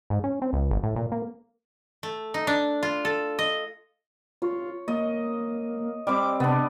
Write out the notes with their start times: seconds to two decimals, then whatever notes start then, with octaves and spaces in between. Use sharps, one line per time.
0.10 G#2
0.24 C#4
0.42 C4
0.53 C#2
0.71 G#1
0.83 A2
0.96 A#2
1.12 A#3
2.03 A3
2.34 D#4
2.47 D4
2.83 F4
3.05 A4
3.39 D#5
4.42 F4 C#5
4.88 A#3 D#5
6.07 G3 C4 D6
6.40 C3 B3 D4